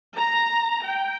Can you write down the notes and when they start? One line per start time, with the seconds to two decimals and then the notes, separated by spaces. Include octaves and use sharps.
0.15 A#5
0.85 G5